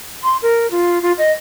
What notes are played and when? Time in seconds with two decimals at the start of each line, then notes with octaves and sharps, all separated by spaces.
0.23 C6
0.42 A#4
0.71 F4
1.02 F4
1.18 D#5